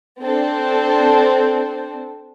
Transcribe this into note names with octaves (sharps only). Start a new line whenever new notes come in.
C4 D4 A4 C5